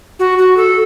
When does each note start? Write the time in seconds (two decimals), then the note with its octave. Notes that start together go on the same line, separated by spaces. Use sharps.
0.19 F#4
0.38 F#4
0.57 A4